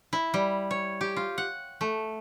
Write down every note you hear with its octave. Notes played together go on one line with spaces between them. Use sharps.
E4
G3
C#5
G4
F4
F#5
A3